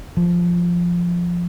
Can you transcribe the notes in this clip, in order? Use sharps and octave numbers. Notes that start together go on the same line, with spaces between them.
F3